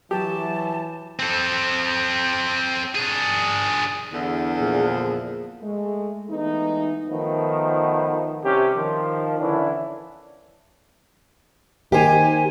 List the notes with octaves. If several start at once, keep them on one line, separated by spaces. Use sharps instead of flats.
E3 F#3 G4 A5
C4 A4
D4 G#4
E2 D3
A#2 F3 G#4
G#3 A3
E3 G#3 A3 B3 D#4
D#3 F3 A3 B3
C2 C3 C#4 G4
D#3 F3
D3 E3 C#4 D4 E4
D#3 A#3 G4 C5 G#5